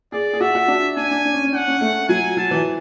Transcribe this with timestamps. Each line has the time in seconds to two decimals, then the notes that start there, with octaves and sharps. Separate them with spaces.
0.12 G#4 D5
0.33 G#4
0.40 F#4 E5
0.55 F#4
0.68 D4
0.97 D4 G#5
1.11 D4
1.25 D4
1.34 C#4
1.44 C#4
1.53 D4 F#5
1.67 C#4
1.81 A3
2.09 F#3 G#5
2.37 F#3 A5
2.51 E3